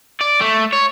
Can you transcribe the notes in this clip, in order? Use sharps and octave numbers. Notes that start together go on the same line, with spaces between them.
D5
A3
C#5